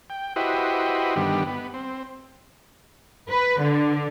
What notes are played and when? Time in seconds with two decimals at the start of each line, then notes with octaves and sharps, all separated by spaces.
0.10 G5
0.36 E4 F#4 G4 B4 C5 D#5
1.16 G2 D3 D#3 G3 B3
1.47 B3
1.74 C4
3.29 B4
3.60 D3